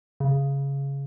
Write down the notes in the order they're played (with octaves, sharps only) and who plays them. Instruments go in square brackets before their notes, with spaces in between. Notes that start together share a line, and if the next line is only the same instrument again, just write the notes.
[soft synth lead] C#3